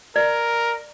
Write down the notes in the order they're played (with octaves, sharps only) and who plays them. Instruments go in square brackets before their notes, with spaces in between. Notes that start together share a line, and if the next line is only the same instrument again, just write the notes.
[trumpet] A#4 [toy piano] D5